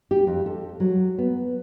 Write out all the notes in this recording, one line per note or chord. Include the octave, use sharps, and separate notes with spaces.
G4
F2
A4
F#3
B3